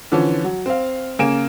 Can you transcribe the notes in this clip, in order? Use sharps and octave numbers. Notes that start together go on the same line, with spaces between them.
D3 E3 F3 C#4
F#3
C4 F5
C#3 A#3 G#5 D7 E7